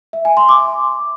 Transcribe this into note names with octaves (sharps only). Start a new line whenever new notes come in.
E5
G#5
C6
D6